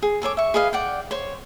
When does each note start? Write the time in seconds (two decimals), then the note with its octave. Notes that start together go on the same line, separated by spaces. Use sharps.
0.02 G#4
0.22 G#4 A4 C#5 D6
0.37 E5 C#6
0.54 G#4 B4 D#5 F5
0.73 D5 F#5 G5
1.11 C5 C#5